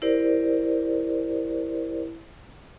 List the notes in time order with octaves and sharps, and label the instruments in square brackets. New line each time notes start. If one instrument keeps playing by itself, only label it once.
[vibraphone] E4 G4 A#4 C5 D5